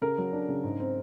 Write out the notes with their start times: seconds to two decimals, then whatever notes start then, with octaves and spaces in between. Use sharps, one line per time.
0.02 C#3 A#4
0.18 F#3
0.32 D4
0.48 C#3
0.63 G#2
0.80 C4